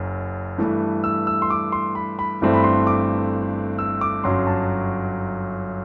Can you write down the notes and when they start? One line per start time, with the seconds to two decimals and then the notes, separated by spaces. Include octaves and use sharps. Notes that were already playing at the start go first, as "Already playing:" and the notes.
Already playing: F#1 F#2 F#3
0.58 G2 E3 A3
1.04 E6
1.27 E6
1.42 C6
1.50 D6
1.72 C6
1.95 B5
2.19 B5
2.42 G1 G2 E3 A3 C4
2.54 B5
2.64 C6
2.87 D6
3.79 E6
4.01 D6
4.24 G1 F#2 F#3 C6
4.47 A5